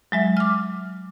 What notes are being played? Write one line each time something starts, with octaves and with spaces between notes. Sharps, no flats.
F#3 G#3 E5
D6 F6